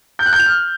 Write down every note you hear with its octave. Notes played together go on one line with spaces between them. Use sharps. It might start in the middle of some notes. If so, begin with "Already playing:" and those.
G6
F#6
G6
F7
F6